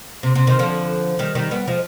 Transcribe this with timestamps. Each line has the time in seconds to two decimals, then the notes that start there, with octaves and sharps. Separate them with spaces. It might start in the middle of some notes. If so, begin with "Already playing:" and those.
0.23 C3
0.35 C3
0.47 C3 D#3
0.59 D3 F3
1.19 D#3 G3
1.35 D#3 G3
1.51 G3 B3
1.68 F3 G#3